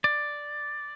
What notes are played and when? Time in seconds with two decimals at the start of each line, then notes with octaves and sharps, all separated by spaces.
0.04 D5